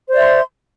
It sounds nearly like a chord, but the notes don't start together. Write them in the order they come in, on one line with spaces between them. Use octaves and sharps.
C5 D5 E5 C6